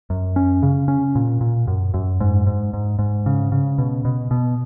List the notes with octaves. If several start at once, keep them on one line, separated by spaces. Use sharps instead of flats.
F#2
C#4
C#3
C#4
A#2
A#2
F#2
F#2
G#2
G#2
G#2
G#2
C#3
C#3
B2
B2
B2